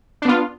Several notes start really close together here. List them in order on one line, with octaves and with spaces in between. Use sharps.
D4 B3 F4